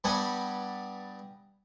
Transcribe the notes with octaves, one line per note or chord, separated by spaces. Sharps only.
G2 G3 B3 B4 F#5 G#5